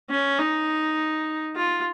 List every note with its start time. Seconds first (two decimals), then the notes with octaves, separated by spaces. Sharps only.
0.11 C#4
0.39 D#4
1.56 F4